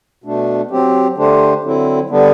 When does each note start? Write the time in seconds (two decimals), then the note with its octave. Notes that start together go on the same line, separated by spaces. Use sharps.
0.24 B2 A3 D4
0.71 F#3 C4 G4
1.16 D3 A3 D4 G4 C5
1.63 D3 F#3 C4 E4
2.09 D3 G3 B3 D4